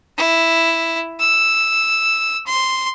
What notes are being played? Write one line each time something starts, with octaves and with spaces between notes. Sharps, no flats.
E4
E6
C6